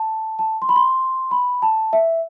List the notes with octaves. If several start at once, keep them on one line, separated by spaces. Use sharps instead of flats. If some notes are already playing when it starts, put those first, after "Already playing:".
Already playing: A5
A5
C6
B5
C6
B5
A5
E5